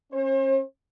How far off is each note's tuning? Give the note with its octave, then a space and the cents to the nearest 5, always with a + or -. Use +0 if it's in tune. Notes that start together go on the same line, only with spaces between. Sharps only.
C#4 -35 C5 +45